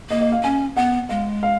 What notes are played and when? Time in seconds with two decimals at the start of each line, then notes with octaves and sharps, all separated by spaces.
0.10 A#3 D#5
0.21 D#5
0.32 F5
0.43 C#4 G#5
0.76 B3 F#5
1.09 G#3 F5
1.43 F5